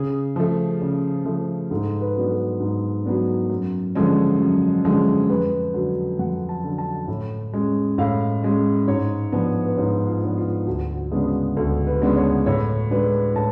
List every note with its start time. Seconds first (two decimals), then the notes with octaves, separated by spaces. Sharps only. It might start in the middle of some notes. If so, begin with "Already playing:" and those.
Already playing: C#3 G#4
0.36 F3 A3
0.81 C#3
1.25 F3 A3
1.71 G#2 A4
2.01 B4
2.16 F#3 B3 D4
2.31 A4
2.60 G#2
3.05 F#3 B3 D4
3.50 F#2
3.95 D3 F3 G#3 C#4
4.40 F#2
4.85 D3 F3 G#3 C#4
5.29 F2 B4
5.74 D3 F#3
6.19 F2 F#5
6.49 A5
6.64 D3 F#3
6.78 A5
7.08 A2
7.53 G#3 C#4
7.98 A2 F5
8.43 G#3 C#4
8.88 G#2 C#5
9.32 F3 B3 D4
9.66 B4
9.77 G#2 C#5
10.07 F4
10.22 F3 B3 D4
10.38 F4
10.67 D2 F#4
11.11 C#3 G#3 B3 D4 G#4
11.57 D2 A4
11.87 B4
12.02 C#3 G#3 B3 D4
12.16 C#5
12.46 A2 C#5
12.91 G#3 D4 B4
13.35 A2 A5